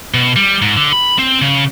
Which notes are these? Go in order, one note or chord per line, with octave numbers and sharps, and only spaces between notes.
B2
G3
G#2
D3
B5
C4
C#3